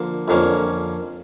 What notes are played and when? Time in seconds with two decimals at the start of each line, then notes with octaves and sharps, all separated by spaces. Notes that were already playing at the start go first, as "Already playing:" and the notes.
Already playing: D3 F3 A#3
0.28 F2 D3 F3 A#3 C#4